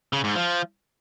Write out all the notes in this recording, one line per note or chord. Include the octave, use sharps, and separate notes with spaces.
C#3
G#2
F3